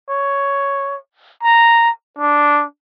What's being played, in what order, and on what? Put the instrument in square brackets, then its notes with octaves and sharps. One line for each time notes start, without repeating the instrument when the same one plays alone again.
[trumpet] C#5
A#5
D4